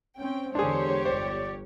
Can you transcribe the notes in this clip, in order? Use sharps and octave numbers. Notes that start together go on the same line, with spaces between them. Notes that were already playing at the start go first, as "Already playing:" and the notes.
C4 C#4 G5
E2 D3 G#3 D4 G4 G#4 C5 C#5
G1 C5 D5